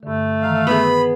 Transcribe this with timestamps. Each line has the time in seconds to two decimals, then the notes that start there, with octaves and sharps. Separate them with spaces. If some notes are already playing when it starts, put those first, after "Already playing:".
0.03 G2 D3 A3
0.42 D#3 E3 F5 A#5
0.67 B3 G#4 B5 D#6